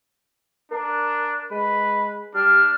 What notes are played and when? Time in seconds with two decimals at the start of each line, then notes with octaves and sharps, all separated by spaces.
0.71 D4 A#4
1.51 G#3 B4
2.35 G3 D4 F6